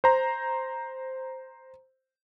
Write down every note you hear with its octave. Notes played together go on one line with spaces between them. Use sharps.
C5 A#5